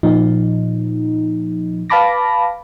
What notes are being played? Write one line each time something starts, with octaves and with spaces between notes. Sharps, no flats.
A#2 F3 D#4
B4 F5 A5 B5 D6 A#6